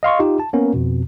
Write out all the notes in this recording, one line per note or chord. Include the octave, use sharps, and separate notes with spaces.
D#5 F5 C6 C#6
D#4 F4 G4
A5
A#3 B3 C#4 A#4
F2 B2